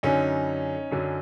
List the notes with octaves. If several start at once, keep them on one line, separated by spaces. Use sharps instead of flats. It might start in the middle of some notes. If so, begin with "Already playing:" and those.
F#2 D3 F#3 C#4 D#4
F#2 D3 F#3